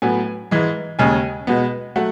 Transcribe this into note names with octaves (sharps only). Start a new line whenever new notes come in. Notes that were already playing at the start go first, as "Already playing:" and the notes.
A2 F#3 B3 G#5
G#2 E3 G#3
D#2 C#3 G#3 G#5
B2 G#3 B3
F#3 A3 F#5